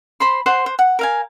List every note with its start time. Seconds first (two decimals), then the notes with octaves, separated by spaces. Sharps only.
0.20 C5 B5 C6
0.46 C5 F#5 C6
0.66 C5
0.79 F#5
0.99 A#4 F5 G#5